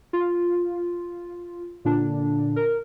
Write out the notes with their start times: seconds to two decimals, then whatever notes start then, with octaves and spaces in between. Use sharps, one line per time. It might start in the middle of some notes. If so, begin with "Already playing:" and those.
0.13 F4
1.85 A#2 D3 D4
2.56 A#4